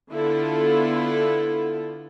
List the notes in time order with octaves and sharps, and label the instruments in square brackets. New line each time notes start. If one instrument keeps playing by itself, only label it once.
[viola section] D3 B3 E4 F4 A4